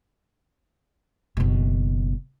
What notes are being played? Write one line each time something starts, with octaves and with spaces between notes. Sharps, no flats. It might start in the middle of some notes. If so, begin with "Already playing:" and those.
F#1 B2